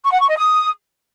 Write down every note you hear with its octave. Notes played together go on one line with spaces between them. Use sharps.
C#6
F#5
C#6
D#5
D#6